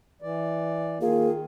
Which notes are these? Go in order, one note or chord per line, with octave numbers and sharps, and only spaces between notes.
E3 D5
D#3 A#3 F4 G#4